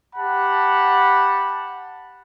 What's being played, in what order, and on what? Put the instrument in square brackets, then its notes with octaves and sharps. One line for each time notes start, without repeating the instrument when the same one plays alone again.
[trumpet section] G4 F#5 A5 B5